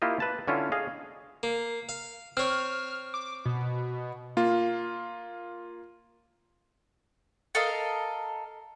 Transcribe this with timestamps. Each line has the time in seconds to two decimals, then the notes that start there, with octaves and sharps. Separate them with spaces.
0.02 A#3 E4 F4 G4 D#5
0.20 B4 A5
0.48 D3 C#4 E4 F4
0.72 G#4 D#5 F5
1.43 A#3
1.89 F5
2.37 C4 C#5 F6
3.14 D6
3.45 B2
4.37 A#3 F4
7.55 A4 A#4 D#5 F5